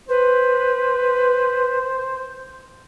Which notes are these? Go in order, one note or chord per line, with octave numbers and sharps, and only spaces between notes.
B4 C5